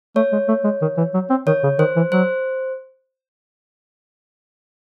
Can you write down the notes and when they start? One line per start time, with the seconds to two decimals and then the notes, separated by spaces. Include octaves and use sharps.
0.16 A3 C#5
0.32 G#3
0.48 A3
0.64 G#3
0.81 D#3
0.97 E3
1.14 F#3
1.30 C4
1.47 D#3 C#5
1.63 C#3
1.79 D#3 C5
1.96 E3
2.12 F#3 C5